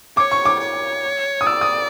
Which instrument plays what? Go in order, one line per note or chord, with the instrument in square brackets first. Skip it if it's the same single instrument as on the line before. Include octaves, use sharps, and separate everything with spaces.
[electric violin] C#5 [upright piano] D6
[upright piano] C#6
D6
[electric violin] C#5
[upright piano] D#6
[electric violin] D5 [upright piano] E6
[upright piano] D#6